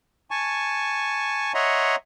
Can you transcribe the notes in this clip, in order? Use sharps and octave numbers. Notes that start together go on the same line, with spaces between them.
G#5 A5 C#6
C#5 D#5 E5 F#5 A#5 C6